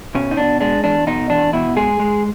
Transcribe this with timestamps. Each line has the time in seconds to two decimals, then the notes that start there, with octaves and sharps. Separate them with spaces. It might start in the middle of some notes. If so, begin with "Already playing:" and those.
0.15 B2 C#4
0.31 D#4
0.37 B2 D4
0.60 G#3 D4
0.84 E2 D4
1.07 B2 D#4
1.30 E2 D4
1.53 B2 E4
1.77 G#3 G#4
1.99 G#3